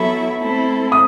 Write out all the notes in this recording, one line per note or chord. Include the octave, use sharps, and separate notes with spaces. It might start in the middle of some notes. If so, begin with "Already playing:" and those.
Already playing: F#3 B3 E4 A4 E5
A3 C4 E4 A4
D#6